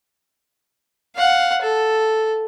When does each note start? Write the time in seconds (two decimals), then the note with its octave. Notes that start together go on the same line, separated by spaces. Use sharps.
1.16 F5 F#5
1.62 A4